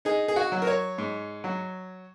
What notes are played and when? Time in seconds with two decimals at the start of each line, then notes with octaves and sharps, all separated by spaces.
0.05 D#4 G#4
0.28 G#4
0.36 F#4
0.52 F#3
0.62 A#4
0.67 C#5
0.98 G#2
1.44 F#3